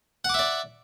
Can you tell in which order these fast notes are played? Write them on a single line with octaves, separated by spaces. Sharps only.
F#5 D6 E5 D5